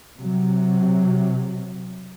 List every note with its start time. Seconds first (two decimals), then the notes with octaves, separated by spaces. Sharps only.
0.18 C3 F#3